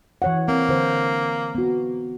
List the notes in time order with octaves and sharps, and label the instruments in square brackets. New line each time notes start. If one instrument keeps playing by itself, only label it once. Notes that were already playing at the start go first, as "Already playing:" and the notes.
[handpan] E3 C#5 F#5
[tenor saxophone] A#3 [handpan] C4
[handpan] D3 C5
B3 F#4